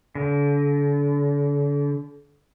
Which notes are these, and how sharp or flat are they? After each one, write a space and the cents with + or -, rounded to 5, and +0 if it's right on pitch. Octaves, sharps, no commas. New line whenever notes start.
D3 -40